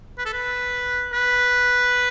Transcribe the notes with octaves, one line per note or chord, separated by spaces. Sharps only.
B4
A4
B4
B4